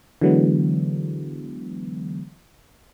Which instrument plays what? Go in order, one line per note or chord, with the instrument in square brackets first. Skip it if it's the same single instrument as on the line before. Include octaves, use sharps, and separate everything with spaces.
[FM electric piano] D3 E3 F#3 G#3 B3